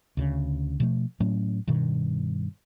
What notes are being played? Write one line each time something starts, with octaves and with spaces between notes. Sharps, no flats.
D2 C#3
B2 F3 A3
A2 F#3 A3 C#4
G2 B2 D#3